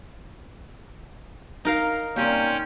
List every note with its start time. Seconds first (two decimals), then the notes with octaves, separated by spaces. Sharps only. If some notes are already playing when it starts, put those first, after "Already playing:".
1.65 D#4 A#4 F5
2.16 C3 G3 A#3 C#4 G5